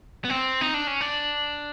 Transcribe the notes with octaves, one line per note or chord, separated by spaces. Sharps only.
B3
C4
D#4
D4
C#4
D4